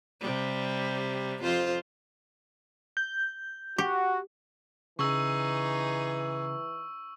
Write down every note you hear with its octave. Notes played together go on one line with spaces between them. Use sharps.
C3 G3
F2 F4 C5
G6
F#4 G4
C#3 E3 D#4 G#4 C#6 E6